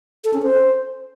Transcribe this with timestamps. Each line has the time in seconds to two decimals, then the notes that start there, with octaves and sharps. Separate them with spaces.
0.24 A4
0.33 C#4
0.43 C5